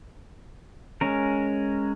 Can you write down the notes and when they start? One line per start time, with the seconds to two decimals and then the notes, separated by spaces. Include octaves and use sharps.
1.01 G#3 C#4 A#4